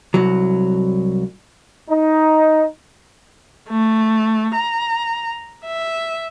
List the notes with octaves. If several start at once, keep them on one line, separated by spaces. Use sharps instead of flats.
C2 F#3
D#4
A3
A#5
E5